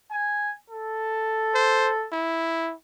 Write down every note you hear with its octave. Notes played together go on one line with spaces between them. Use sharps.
G#5
A4
C5
E4